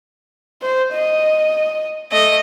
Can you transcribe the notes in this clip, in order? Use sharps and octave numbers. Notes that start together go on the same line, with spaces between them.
C5
D#5
A3 D#5